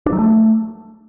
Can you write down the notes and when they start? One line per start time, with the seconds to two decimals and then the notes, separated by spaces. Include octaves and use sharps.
0.06 D4
0.12 F#3
0.19 A3